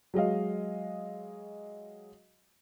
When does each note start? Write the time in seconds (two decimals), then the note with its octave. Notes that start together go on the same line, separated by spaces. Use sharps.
0.14 F#3 G#3 D#5 F5